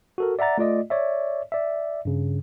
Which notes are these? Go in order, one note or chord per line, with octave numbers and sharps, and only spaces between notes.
F#4 A4 A#4
D5 E5 F#5 A#5 A6
A3 F4 D5 D#5
C#5 D5 E5
D5 E5
G2 C#3